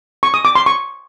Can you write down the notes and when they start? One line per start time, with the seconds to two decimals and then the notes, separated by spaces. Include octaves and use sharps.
0.23 C#6
0.34 D#6
0.45 D6
0.55 C6
0.66 C#6